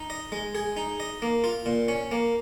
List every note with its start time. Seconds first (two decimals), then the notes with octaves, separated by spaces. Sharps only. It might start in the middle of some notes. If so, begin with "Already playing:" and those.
Already playing: D#4
0.10 D#5
0.32 G#3
0.55 G#4
0.77 D#4
1.00 D#5
1.22 A#3
1.44 F4
1.66 A#2
1.88 C#4
2.11 A#3